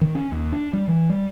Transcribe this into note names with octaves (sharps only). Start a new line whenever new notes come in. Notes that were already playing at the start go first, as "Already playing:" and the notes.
D#3
C#4
D#2
D4
G3
E3
G3